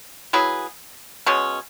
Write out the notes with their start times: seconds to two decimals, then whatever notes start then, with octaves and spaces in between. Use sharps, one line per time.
0.33 F#3 E4 G#4 B4
1.26 B2 G#3 C#4